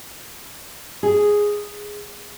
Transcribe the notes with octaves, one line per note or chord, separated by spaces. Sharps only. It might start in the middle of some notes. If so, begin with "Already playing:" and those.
G#4